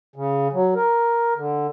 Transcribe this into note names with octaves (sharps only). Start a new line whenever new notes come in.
C#3
F#3
A#4
D3